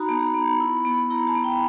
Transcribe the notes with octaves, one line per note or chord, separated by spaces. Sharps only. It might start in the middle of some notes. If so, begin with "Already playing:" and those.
Already playing: D#4 F#4 A#5 B5
B3 A5
A#5
B5
B3
E4 B5
B5
B3
B5
E4 A#5
A5
B3
G5